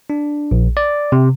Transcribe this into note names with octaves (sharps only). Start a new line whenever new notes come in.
D4
A#1
D5
C3